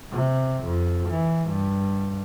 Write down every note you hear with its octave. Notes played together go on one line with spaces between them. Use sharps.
C3
F2
E3
G2